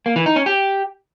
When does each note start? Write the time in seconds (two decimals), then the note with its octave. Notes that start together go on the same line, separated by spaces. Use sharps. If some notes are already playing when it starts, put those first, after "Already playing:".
0.06 A#3
0.16 E3
0.26 D#4
0.36 C#4
0.46 G4